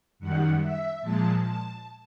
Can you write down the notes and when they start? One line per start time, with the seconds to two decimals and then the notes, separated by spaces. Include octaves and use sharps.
0.19 F#2 D#3 G3 F#5
0.61 E5
1.01 A#2 F3 G#3 A5
1.42 A5